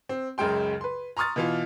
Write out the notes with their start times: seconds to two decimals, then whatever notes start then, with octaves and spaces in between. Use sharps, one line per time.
0.09 C4
0.38 C#2 F#2 C#3 G#3 G5 C6
0.81 B4 C6
1.17 A#5 C6 C#6 D#6 F6 A6
1.36 B2 E3 F4